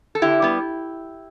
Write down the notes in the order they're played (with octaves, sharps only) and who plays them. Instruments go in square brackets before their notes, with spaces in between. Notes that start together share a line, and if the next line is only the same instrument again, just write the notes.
[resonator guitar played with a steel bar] A4
D3 E4 G4
G3 B3